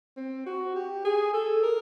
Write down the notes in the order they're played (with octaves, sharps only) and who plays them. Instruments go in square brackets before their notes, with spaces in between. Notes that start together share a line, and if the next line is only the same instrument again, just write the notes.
[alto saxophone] C4
F#4
G4
G#4
A4
A#4